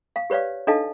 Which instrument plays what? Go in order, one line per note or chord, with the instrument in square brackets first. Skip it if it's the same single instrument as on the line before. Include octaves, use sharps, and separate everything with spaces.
[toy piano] F5
G4 B4 C#5 D5 F5
D4 D#4 A4 D#5 F5 A5